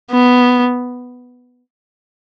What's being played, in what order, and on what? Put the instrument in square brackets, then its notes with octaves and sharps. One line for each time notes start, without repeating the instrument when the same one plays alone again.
[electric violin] B3